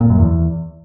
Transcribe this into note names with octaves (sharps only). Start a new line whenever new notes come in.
A#2
F#2
E2